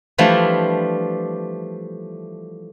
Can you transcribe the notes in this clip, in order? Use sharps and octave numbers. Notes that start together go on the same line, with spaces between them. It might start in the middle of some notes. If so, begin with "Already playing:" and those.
E3 F3 G3 A3 D4